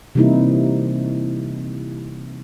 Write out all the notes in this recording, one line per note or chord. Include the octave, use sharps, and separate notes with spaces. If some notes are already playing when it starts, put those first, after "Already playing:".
C3 E3 G3 A#3 D#4 E4